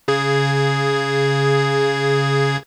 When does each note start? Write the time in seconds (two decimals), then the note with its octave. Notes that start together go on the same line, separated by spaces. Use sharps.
0.08 C#3 G#4 G#6